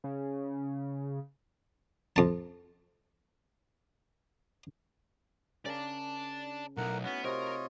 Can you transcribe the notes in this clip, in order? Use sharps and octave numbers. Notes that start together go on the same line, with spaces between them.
C#3
F2 A5
C#3 C#4 A#4 D5 A5
B1 A3 D#4 E4 A#4 F#5
B3 C#4 F#4
C3 F4 A#4 C#5 D#5